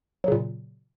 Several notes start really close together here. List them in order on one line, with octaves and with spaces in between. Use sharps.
F#3 C#3 A#2